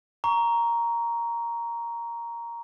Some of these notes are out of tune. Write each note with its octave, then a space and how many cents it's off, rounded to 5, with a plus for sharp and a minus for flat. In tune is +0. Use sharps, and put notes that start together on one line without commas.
A#5 +0 C#6 +25